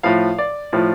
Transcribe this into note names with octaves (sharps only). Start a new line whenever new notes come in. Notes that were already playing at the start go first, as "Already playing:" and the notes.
A2 F3 F5
D5
A2 F3